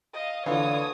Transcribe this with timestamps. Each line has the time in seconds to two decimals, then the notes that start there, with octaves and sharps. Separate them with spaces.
0.14 D#5 F5
0.46 D3 E3 F4 C#5 D#6